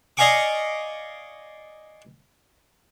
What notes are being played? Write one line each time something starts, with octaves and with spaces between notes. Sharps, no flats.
D5 D#5 F5 G#5 C#6 D6